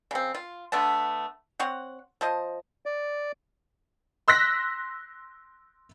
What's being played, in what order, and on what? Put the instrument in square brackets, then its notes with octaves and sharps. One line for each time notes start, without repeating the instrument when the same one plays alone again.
[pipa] C#3 C4
F4
D3 A3 B3 A5
C4 C#5 F#5
F3 C5 D#5
[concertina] D5
[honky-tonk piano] C6 E6 F#6 A#6 B6